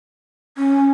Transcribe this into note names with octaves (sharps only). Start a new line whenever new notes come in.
C#4